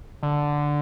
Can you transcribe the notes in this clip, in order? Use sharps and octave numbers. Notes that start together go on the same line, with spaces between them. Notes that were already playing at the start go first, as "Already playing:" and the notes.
D3